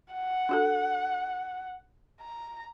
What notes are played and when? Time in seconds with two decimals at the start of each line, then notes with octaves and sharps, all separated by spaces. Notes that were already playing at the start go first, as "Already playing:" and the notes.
0.13 F#5
0.49 D4 F#4 A4
2.21 A#5